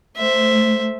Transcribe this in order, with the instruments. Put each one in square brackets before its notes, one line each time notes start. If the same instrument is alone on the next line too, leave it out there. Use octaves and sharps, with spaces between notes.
[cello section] A3 [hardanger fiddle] C5 E5